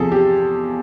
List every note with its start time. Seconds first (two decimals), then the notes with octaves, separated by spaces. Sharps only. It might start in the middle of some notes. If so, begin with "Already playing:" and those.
Already playing: E2 C3 F3 G#4 A4
0.12 G4